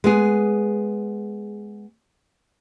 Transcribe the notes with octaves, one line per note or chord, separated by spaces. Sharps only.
G#3 B3 G#4